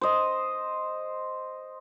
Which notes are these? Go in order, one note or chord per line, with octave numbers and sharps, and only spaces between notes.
C5 D#5